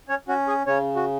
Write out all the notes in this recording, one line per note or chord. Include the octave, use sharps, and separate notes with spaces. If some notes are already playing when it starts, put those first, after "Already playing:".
C#4 C#5
C#4 F#4
G#4
C#3 C#4 C#5
F#4